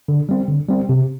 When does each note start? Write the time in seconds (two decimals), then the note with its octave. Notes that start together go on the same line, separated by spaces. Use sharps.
0.08 D3
0.29 G3 C4
0.48 D3
0.68 G3 C4
0.89 C3